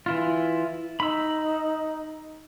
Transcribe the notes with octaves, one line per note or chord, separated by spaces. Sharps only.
E3 E4 F4
D#4 B5 E6